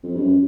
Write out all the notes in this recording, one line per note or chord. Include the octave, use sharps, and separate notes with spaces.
F2
G2
F#2